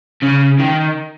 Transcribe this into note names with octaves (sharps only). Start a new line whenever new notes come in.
C#3
D#3